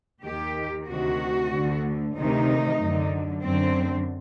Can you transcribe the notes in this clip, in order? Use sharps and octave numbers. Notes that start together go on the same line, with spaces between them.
D#2 D#3 G4
D2 C3 D#3 F#4
D2 D3
D2 C3 D#3 D#4
F#2 D3
F#2 D3 C4